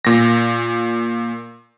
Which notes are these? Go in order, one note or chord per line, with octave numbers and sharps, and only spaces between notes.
A#2 A#6